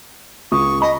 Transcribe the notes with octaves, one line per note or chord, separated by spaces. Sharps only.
C#2 C#6 D#6
D#5 B5